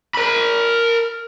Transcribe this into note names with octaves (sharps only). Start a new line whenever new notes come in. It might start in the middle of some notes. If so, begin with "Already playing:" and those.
A#4 B5